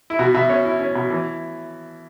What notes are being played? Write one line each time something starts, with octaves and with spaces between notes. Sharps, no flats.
E4
B2 F#4
B2 E5
C#4 C#5
E4
C#4
B2
E3